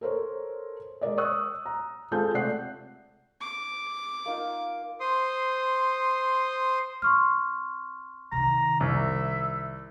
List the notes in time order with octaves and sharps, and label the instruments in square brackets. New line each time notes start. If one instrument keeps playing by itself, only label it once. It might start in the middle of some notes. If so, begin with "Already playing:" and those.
[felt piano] A4 A#4 C5 C#5
G#3 A#4 D5 D#5
C#6 D#6 E6 F#6
A#5
G#3 C4 F4 A4 A5 G6
C3 A3 D5 F#5 F#6 C7
[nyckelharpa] D6
[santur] A#3 D#4 F4
[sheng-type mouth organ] C5 C6 D#6
[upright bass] C4 [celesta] C6 C#6 F6
[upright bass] C3 D#3 [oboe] A#5
[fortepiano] C2 [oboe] E5